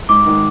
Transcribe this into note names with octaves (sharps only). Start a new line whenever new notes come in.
G#2 D6
D#3 G#3